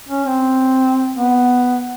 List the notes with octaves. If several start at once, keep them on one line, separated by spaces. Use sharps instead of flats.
C#4
C4
B3